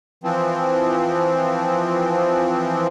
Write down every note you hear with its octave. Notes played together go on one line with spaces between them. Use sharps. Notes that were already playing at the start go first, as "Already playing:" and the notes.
E3 F3 C4